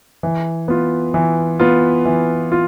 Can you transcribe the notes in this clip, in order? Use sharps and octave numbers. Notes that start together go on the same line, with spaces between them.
E3
B3 F4
E3
B3 F4
E3
F4